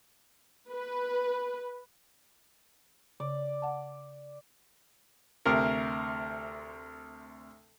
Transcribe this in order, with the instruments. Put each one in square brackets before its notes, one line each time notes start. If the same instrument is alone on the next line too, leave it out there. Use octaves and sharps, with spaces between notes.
[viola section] B4
[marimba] C#3 [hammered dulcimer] D5
[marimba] F#5 A5
[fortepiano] D2 C3 A#4